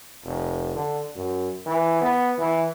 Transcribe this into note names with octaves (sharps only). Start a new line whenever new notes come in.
F1
D3
F#2
E3
B3
E3